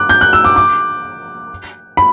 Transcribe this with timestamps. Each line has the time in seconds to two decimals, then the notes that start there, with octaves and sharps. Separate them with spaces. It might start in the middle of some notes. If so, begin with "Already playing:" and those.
Already playing: D6 F#6
0.09 G6
0.21 F#6
0.33 E6
0.45 D6
0.56 D6
1.97 B5